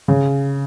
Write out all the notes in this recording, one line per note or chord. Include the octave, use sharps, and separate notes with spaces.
C#3